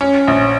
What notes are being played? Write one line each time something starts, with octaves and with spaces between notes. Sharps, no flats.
C#4
A#1